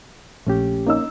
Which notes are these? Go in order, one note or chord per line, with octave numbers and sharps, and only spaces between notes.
A#1 A3 C#4 G4
A#3 C#4 D#4 E6